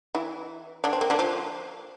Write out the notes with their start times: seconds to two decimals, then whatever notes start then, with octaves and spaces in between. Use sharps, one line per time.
0.15 E3 E4
0.84 D3 D4
0.93 C4
1.01 A#3
1.10 D3 D4
1.19 F3 F4